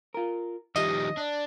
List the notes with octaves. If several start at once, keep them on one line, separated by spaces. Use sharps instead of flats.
F4 A#4
D#3 F3 G3 G4 D#5 E5
D4 D5